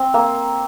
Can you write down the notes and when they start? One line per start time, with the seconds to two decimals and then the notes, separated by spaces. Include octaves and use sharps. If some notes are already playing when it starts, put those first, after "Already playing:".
Already playing: C4
0.14 A#3